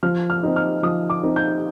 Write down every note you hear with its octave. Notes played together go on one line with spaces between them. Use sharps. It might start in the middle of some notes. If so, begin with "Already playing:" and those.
F3 F6
F6
C4 D#4
F6
F3 D#6
D6
C4 D#4
G6